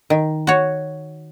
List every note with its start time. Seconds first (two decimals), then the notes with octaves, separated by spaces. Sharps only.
0.10 D#3
0.47 F#4 C#5